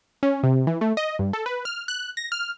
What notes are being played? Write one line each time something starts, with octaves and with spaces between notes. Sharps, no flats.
C#4
C3
E3
A3
D#5
G2
A4
B4
F6
F#6
A#6
F6